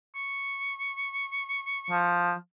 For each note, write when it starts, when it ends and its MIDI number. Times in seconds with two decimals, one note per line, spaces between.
0.15 2.10 85
1.90 2.33 53